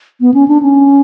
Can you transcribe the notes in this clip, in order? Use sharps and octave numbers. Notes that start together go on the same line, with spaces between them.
B3
C#4
D4
C#4